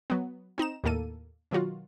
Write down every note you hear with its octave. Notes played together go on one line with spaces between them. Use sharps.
F#3 B3
C4 D#4 A#5 E7
D#2 A2 A#3 A4 D#7
B2 D#3 F#3 F4 F#4